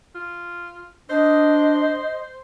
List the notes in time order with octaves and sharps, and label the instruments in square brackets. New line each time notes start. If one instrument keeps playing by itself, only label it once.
[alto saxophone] F4
[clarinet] D4 [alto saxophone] C5 [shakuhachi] D#5